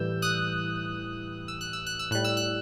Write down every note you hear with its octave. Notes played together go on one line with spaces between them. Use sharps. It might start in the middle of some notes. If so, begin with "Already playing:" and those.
Already playing: A2 E3 G3 E6 G6
D#6 F#6
E6
F#6
E6
F#6
E6
A2 G3 F#6
E6
F#6